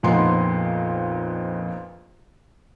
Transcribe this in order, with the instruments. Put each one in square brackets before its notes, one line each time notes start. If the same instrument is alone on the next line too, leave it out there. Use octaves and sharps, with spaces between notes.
[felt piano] A#1 F2 A#2 B3 D#4 C6